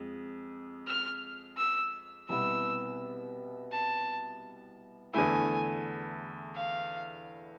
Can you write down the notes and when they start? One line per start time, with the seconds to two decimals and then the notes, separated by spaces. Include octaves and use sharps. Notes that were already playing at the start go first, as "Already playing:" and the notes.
Already playing: F2 G#3
0.87 F6
1.58 E6
2.29 C2 B2 B3 E4 E6
3.72 A5
5.14 E2 D3 A3 E4 G#5
6.56 F5